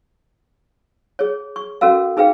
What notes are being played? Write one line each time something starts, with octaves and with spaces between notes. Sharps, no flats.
G#4 C#5
C#6
C#4 F#4 A4 A#4 F5
D#4 G#4 B4 F5 G5